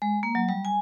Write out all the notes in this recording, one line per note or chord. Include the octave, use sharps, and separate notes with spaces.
G#3
A#3
F#3
G3
G#5